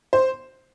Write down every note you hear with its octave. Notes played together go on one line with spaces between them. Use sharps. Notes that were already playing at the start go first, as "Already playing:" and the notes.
C5